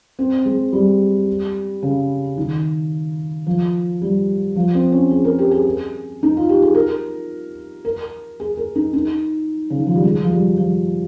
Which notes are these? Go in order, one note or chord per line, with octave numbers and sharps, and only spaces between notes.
C4
G#3
G3
C#3
D#3
F3
G3
F3
C4
C#4
G#4
A#4
G4
G#4
D#4
F4
G4
G#4
A#4
A#4
G#4
A#4
D#4
D#4
C#3
D#3
F3
G3
G#3
F3
G3
F3